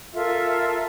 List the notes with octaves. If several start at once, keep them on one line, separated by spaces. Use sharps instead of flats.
F4 A4 A#4 E5